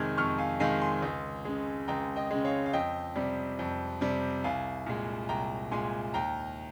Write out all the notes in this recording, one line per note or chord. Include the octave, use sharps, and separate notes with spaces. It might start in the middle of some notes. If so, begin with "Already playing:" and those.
Already playing: F2 C3 D#3 G#3 F6 G#6
F2 C#6 F6
F5 G#5
C3 D#3 G#3 F5 G#5
G#5 C6
C#2
C#3 G#3
C#2 G5 A#5
D#5 G5
C#3 G#3
C#5 F5
F5
F2 D#5 G5
C3 G3
F2
C3 G3
C2 F5 G#5
A#2 G#3
C2 G5 A#5
A#2 G#3 G#5 C6
D#2 G5 A#5